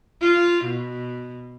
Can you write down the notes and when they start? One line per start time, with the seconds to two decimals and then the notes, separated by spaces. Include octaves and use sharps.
0.22 F4
0.64 B2